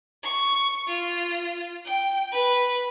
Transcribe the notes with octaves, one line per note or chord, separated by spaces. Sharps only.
C#6
F4
G5
B4